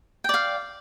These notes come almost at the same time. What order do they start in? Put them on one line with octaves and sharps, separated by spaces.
G5 D5 F5